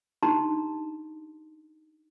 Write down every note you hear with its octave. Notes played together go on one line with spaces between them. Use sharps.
D4 D#4 G4 A5 A#5 C6